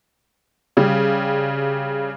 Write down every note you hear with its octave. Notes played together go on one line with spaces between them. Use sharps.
C#3 G3